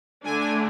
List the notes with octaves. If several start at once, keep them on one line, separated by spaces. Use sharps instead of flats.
D3 A3 D4 G#5